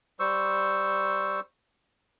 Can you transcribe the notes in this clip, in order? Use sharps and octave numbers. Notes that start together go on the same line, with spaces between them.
G3 C5 C#6 E6